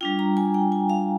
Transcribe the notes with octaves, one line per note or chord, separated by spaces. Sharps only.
G3 D4 F4 G5
A#5
G#5
G5
G#5
F5